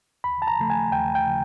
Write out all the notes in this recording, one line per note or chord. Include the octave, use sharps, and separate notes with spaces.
D#2 B5
A5
A#5
C#3 F3 A3
G#5
D#2 G5
G5
C#3 F3